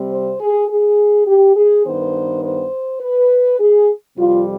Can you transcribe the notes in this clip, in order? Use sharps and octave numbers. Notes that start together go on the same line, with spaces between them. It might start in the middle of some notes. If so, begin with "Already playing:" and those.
Already playing: C3 G3 C4
C5
G#4
G#4
G4
G#4
G2 D#3 B3 C5
C5
B4
G#4
F2 C3 G3 F4